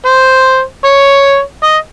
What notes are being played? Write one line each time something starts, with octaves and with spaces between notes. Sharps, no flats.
C5
C#5
D#5